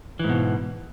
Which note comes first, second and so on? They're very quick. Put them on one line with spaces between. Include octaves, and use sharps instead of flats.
E3 G#2 B2